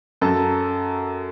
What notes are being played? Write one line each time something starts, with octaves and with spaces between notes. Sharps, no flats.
F#2 A4